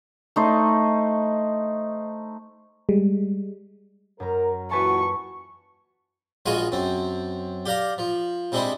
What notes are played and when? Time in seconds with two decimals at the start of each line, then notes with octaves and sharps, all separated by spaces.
0.36 A3 D#4 C5
2.89 G3 G#3
4.20 F#2 A#4 A#5
4.71 A#2 E3 F#4 B4 G#5 A5 C#6
6.46 A#1 G#3 F4 F#4 G#5 C#6
6.72 F#2 C4
7.66 G4 D5 F5 A#5
7.98 F3
8.52 C3 G#3 C4 D4 E4